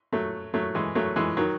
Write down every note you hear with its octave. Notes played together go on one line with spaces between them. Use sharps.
F#3 A3
F#3 A3
E3 G#3
F#3 A3
E3 G#3
D#3 F#3